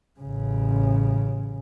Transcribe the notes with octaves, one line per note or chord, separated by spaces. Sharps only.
A1 C#3